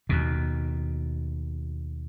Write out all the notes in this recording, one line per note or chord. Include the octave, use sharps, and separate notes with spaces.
D#2 B2